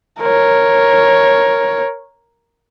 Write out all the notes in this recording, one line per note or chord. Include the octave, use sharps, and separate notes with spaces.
A#4 C#5